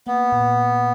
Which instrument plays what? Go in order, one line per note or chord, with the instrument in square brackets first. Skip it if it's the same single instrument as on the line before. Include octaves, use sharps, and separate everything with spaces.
[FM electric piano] A#3 [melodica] B3
[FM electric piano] A#2